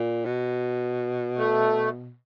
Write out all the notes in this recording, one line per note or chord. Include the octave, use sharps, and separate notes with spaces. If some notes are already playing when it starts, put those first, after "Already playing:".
Already playing: A#2
B2
A3